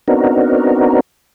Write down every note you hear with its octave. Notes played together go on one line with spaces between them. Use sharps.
B3 C4 D4 D#4 F#4 A#4